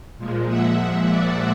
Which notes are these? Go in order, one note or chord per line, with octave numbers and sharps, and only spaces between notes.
A#2 F3 G#3
E5 F#5
D5 E5